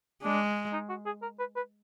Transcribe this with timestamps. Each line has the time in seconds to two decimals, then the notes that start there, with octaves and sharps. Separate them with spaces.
0.23 G#3 D4
0.73 D#4
0.89 F#4
1.06 G#4
1.22 A#4
1.39 B4
1.56 B4